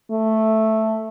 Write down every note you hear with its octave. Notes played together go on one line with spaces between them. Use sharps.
A3